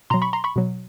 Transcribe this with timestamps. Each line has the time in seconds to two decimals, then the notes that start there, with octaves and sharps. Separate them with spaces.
0.10 B2 A#5 C6
0.14 F#3
0.22 B5 C#6
0.33 A#5 C6
0.44 B5 C#6
0.56 B2 F#3